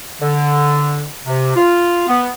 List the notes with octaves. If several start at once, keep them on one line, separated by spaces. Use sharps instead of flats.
D3
C3
F4
B3